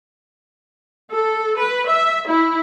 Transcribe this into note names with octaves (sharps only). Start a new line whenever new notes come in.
A4
B4
E5
E4